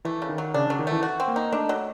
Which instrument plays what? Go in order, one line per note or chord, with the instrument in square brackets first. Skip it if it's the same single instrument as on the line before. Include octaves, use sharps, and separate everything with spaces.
[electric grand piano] E3 [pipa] A3
[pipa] C#3
[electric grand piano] D#3
[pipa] F#3
[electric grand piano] C#3 [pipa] D4
[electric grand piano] C#3 [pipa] F#3
[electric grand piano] D#3
[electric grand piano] E3 [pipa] A3
[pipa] F#4
C4
[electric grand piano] A#3
[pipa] D#4
[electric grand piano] A3 [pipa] D4
[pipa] F#3